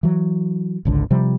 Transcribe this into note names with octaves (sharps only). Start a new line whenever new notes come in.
E3 F#3
G#1 C#2 D3
C3 F3 G3